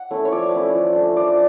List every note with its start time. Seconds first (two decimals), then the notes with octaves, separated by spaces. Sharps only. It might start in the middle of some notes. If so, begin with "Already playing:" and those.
Already playing: F#5
0.11 A3 C#4 E4
0.25 C#5
0.32 F3 D5
0.54 A3 C#4 E4
0.74 F3
0.95 A3 D4
1.16 F3 D5